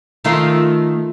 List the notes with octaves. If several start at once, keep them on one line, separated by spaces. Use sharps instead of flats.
D#3 A3 F4